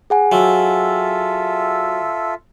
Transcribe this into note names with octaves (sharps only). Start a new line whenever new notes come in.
G#4 F#5 G#5
F#3 F4 A4 E5